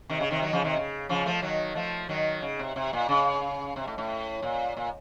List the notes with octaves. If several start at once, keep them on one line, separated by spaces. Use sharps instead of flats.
C3 D#3
C#3
C3 D#3
D#3 F#3
C#3 F3
C3 D#3
C#3
C#3 F3
F3 A3
D#3 F#3
F3 A3
D#3 F#3
C#3
C3
C3
A#2
C#3
C3
A2
A2
A#2
A#2